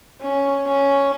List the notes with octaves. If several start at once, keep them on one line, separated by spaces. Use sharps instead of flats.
C#4
C#4